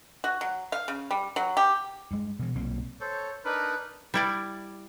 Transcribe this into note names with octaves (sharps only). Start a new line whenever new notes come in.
F#4
F#3
F5
C#3
G3
F#3
G4
G2 G#3
B2 E3
B1 A#2 A#3 C4
A4 C5 C#5
D4 D#4 A#4 B4
G3 E4 D5